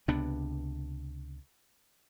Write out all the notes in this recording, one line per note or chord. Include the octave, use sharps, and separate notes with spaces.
C#2 C3 B3 D4